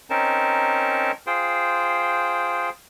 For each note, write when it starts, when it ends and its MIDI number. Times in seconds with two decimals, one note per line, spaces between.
0.10 1.12 60
0.10 1.12 61
0.10 1.12 63
0.10 1.12 70
0.10 1.12 81
1.27 2.70 65
1.27 2.70 68
1.27 2.70 72
1.27 2.70 79